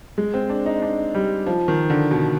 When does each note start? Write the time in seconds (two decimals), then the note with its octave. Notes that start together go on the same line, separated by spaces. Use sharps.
0.18 G#3
0.34 C4
0.49 D4
0.66 D#4
0.82 D4
1.14 G3
1.46 F3
1.68 D#3
1.90 D3
2.11 B2